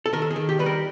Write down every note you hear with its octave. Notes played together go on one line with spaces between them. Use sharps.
A4
D#3 A#4
A4
G#4
D#3
G4
G3 B4
A#4